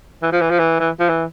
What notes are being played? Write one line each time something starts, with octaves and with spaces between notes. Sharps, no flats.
E3
F3
E3
F3
E3
E3
F3
E3